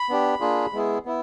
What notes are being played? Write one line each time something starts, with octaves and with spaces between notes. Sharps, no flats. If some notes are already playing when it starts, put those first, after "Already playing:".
Already playing: B5
B3 D4 G4
A#3 D4 F4 G#4
G#3 B3 E4 G#4
B3 E4